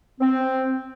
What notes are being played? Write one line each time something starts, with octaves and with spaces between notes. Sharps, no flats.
C4